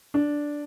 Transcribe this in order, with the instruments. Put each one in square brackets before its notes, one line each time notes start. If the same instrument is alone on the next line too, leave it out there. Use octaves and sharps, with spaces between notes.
[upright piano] D4